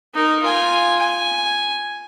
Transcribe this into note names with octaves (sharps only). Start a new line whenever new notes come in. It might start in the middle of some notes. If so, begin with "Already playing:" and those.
D#4 A#4
F4 G#5
G#5